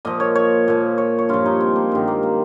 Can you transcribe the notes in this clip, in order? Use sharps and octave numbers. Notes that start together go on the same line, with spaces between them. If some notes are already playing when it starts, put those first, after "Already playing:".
A#2 F3 D#5
C#5
C#5
A#2 F3
C#5
C#5
G2 F3 F4
D#4
C4
A#3
G2 D#3 G#3
A#3
A#3